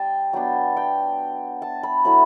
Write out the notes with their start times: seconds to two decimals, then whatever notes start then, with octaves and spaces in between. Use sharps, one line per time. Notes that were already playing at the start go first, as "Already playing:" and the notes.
Already playing: G3 D5 G5 A5
0.33 F#3 B3 D4 G5
0.77 G5
1.62 A5
1.83 B5
2.05 F#3 A3 E4 B5